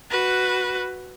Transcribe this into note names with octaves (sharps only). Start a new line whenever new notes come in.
F#4 B4